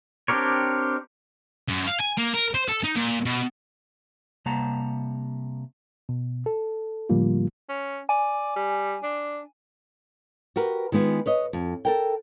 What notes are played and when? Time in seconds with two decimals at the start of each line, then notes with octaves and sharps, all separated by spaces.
0.28 C4 D4 G4 A#4 C#5
1.68 F#2
1.87 F5
2.00 G#5
2.17 A#3
2.34 A#4
2.54 C5
2.68 A4
2.84 D#4
2.96 A#2
3.26 B2
4.46 C3 G3 A#3 F#5 A5 A#5
6.09 B2
6.46 A4
7.09 A2 D3 F3 G3 A#3 F4
7.69 C#4
8.09 D5 G#5
8.56 G3
9.03 D4
10.56 F#4 G4 A#4 B4
10.92 D#3 G#3 B3 F4 G#4
11.26 B4 C#5 D#5
11.53 F2
11.85 A4 A#4 G5